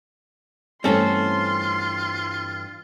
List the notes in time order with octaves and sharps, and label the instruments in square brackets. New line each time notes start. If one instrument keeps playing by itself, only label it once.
[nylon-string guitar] G2 E3 A3 [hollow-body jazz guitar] C4 C#4 A4 [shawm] F4 [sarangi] C6